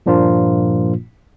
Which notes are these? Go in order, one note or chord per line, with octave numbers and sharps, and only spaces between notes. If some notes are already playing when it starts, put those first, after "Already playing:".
G2 A#2 F3 A#3 D4 F4